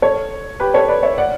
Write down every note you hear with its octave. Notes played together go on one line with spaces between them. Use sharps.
A4 C#5
G4 B4
A4 C#5
B4 D5
C#5 E5
D5 F#5